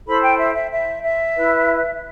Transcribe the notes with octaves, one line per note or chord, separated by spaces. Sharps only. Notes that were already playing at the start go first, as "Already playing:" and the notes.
E4 A4 C5 B5
G5
E5
E5
E5
E5
E4 B4